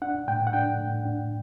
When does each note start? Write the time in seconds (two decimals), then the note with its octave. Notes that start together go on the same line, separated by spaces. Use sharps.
0.02 D4 F#5
0.28 A2 G5
0.47 F#5
0.53 D4 G5
0.79 A2
1.05 D4